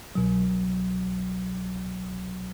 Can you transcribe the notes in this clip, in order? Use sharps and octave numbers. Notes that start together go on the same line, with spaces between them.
C2 B2 F#3